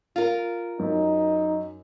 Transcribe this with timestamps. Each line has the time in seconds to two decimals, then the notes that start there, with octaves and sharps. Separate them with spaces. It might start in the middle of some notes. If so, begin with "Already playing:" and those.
0.16 F4 A#4
0.79 F#2 D#4